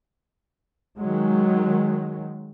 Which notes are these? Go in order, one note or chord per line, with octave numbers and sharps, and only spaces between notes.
D#3 F#3 G#3